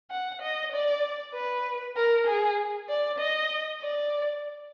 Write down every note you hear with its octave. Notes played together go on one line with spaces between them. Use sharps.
F#5
D#5
D5
B4
A#4
G#4
D5
D#5
D5